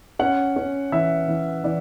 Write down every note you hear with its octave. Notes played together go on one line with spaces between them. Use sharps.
C#4 F#5
C#4
E3 E5
E3
E3 D5